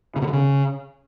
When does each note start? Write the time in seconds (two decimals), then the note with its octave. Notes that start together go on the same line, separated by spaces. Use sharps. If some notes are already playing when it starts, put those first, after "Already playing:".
0.16 C#3
0.22 B2
0.27 D3
0.33 C#3